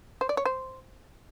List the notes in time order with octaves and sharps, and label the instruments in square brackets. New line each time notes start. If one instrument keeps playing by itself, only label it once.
[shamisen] C5
D5
C#5
C5